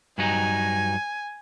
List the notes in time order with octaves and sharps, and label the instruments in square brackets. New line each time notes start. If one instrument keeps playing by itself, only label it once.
[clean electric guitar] G2 F#3 D#4 [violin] G#5